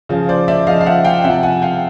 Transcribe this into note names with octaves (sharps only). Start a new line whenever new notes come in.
C#3 F3
C5 D5
D5 E5
C#3 F3 D#5 F5
F5
E5 F#5
F5 G5
C3 F3 E5 F#5
F#5 G#5
F5 G5